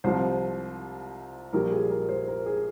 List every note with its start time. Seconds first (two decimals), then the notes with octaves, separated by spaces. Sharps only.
0.04 C2 C3 F3 C5
1.53 A#1 A#2 G3 A#4
1.72 G#4
1.91 A#4
2.09 C5
2.28 A#4
2.46 G#4